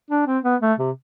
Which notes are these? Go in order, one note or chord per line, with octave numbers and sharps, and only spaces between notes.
D4
C4
B3
A3
C3